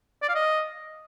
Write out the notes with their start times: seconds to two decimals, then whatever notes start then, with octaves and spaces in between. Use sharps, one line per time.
0.22 D5
0.29 F5
0.35 D#5